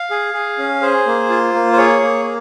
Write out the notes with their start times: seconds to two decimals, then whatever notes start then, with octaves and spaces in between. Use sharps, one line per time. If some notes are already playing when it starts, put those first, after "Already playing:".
Already playing: F5
0.10 G#4
0.33 G#4
0.58 C#4
0.81 G#4 C5
1.06 A#3
1.30 F4
1.54 A#3
1.73 C5
1.77 G#4 C#5
2.02 A#3